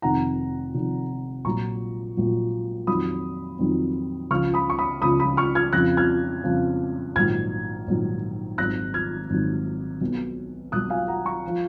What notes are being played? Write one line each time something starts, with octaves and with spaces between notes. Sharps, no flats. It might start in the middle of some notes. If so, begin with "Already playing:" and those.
F1 F2 D#3 F#5 A#5
F1 F2 D#3
A#1 A#2 F#3 A#5 C#6
A#1 A#2 F#3
F2 D#3 F#3 B5 D#6
F2 D#3 F#3
C#2 C#3 F3 C#6 F6
B5 D#6
C#6
B5 D#6
C#2 C#3 F3 B5 D#6
B5 D#6
C#6 F6
F6 G#6
F2 C#3 F3 F#6 A#6
F6 G#6
F2 C#3 F3
A#1 G#2 D#3 F#3 F6 G#6
A#1 G#2 D#3 F#3
G#1 G#2 D#3 F#3 F#6 A#6
F6 G#6
G#1 G#2 D#3 F#3
B1 B2 F#3
B1 B2 F#3 D#6 F#6
F5 G#5
F#5 A#5
A#5 C#6
F3